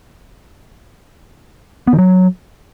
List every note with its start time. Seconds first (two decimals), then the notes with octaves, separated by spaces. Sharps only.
1.87 B3
1.93 D#3
1.99 F#3